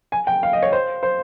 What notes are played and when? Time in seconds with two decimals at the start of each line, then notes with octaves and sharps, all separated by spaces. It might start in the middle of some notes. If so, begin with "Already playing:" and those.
0.12 G#5
0.27 G5
0.43 F5
0.53 D#5
0.62 C#5
0.72 C5
1.03 C5